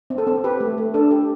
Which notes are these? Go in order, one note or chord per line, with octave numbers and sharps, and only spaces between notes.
C4
A4
C4
G4 B4
A3
A3
D4 A4
G4